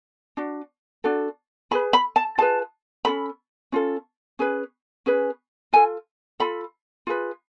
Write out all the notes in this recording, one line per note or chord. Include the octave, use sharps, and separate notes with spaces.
D4 F#4
D4 F#4 A4
F4 G#4 B4 B5
B5
A5
F4 G#4 B4 A5
C#4 F4 A4 B5
C#4 F4 A4
C#4 G#4 B4
C#4 G#4 B4
F4 A4 G#5
F4 A4 B5
F4 G#4 B4